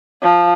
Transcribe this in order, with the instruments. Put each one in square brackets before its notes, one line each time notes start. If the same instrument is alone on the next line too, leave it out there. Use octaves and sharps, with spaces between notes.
[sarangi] F3